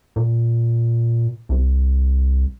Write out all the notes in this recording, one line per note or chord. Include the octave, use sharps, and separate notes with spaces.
A#2
C2